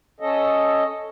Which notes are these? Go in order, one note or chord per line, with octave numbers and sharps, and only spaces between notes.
C#4 A4 D#5